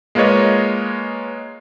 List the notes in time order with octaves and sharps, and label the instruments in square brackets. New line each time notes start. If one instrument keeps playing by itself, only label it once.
[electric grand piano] G#3 A#3 F4 B4 C#5 D#5